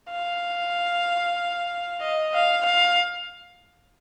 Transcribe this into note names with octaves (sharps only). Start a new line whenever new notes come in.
F5
D#5
F5
F5